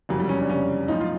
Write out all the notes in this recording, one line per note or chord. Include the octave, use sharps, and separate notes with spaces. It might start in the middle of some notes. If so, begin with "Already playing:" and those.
F#1 F2 C3 F#3
G3
C#4
D4
F#1 F2 C3 C#4
B1 A2 F3 D#4
F4